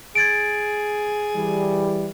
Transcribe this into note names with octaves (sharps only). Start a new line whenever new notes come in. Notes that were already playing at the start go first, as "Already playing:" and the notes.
G#4 G#6 A6 D7
E3 G3